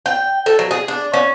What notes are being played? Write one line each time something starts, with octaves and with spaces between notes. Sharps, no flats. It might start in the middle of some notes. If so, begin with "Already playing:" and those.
G5
A4
F#3
G#4
D4
C#4